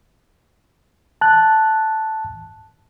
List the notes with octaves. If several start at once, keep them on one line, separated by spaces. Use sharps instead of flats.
A5 F#6